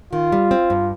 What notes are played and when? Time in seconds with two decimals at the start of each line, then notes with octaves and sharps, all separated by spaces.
0.13 D#3 F4
0.32 G3
0.51 C4
0.70 G2